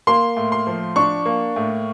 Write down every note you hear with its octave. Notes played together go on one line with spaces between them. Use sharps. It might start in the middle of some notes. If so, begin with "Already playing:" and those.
A#3 C6
A2
C6
F3
D4 C#6
A#3
A2